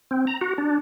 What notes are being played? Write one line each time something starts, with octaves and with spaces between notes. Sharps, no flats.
C4
A#5
F#4
D4